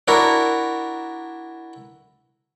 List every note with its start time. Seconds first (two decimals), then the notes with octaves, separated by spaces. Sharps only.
0.08 D4 E4 F#4 A#4